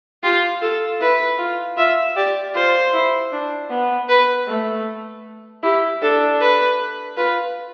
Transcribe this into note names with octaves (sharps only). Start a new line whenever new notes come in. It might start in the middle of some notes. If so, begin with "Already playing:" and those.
F4 G4
F4 A4
E4 B4
F4
F4 E5
G4 D5
F4 C5
E4
D4
B3
B4
A3
E4 G4
D4 A4
B4
F4 B4